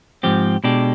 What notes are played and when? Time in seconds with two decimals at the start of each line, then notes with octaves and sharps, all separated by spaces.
0.23 G#2 F3 C4 G4
0.64 B2 G#3 D4 G4